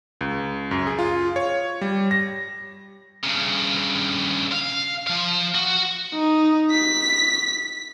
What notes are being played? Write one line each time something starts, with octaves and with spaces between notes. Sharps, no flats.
C#2
F#2
G#4
F4
C#5
G3
A#6
G2 C#3
F5
F3 F5
F#4
D#4
B6